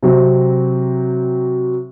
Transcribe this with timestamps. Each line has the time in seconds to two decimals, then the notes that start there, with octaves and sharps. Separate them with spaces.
0.03 C3 F#3 C4